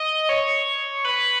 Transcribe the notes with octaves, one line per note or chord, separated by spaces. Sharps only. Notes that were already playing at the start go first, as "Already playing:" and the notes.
Already playing: D#5
C#5
B4